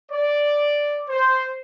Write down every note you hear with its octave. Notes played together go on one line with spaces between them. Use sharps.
D5
C5